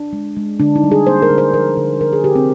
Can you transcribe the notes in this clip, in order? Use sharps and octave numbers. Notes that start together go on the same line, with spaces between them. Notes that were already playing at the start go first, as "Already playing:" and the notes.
Already playing: D4
G#3
G#3
D3 D4
D#4
G3
G#4
A#3 C5
A#4
D3
C5
F3 A#4
D3
D3 A#4
G#4
D3 G4
C4